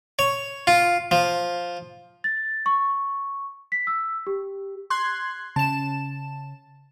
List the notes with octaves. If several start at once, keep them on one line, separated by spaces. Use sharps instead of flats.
C#5
F4
F3
A6
C#6
B6
E6
G4
C6 F#6 G#6
C#3 A5 E7